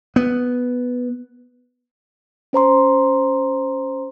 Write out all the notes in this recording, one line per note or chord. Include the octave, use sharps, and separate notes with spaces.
B3
C#4 C5 A#5 C6